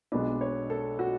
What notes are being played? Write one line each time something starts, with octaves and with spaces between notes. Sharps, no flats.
B1 B2 G#3 B3 D4
C#5
A4
F#4